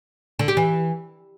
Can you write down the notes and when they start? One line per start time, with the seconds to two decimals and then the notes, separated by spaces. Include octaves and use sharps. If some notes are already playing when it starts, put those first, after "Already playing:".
0.39 D3
0.48 G4
0.57 E3